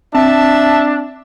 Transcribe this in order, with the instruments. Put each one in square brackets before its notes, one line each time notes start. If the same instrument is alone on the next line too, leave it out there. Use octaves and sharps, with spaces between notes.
[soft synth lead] C4 [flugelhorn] D4 [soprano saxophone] E5 [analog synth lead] A5